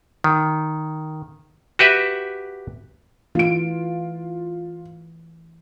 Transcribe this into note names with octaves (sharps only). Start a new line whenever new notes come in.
D#3
F#4 G4 B4 E5
E3 A3 F4 D7